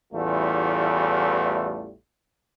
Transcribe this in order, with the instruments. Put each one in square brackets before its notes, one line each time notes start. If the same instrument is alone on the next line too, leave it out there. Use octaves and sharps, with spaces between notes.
[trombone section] A1 E2 G3 A3 F4